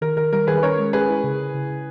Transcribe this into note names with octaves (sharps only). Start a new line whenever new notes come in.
D#3 A#4
D#3 A#4
G3 A#4
D#3 G#4 B4
B4
C#4 A#4 C#5
G#3
C#4 G#4 B4
E4
C#3
C#3
C#3
C#3